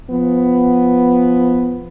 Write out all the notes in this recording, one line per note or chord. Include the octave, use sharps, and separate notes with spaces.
F3 B3